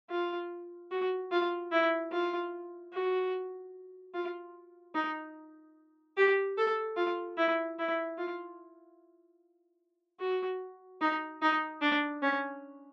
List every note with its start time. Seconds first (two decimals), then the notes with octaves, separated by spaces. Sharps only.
0.10 F4
0.91 F#4
1.32 F4
1.72 E4
2.12 F4
2.93 F#4
4.14 F4
4.95 D#4
6.17 G4
6.58 A4
6.97 F4
7.38 E4
7.79 E4
8.18 F4
10.20 F#4
11.01 D#4
11.42 D#4
11.82 D4
12.22 C#4